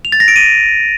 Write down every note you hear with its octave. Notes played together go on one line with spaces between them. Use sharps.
F7
A6
A#6
D7
D#7